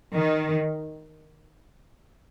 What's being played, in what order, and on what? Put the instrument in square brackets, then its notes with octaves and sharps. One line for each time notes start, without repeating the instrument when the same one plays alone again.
[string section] D#3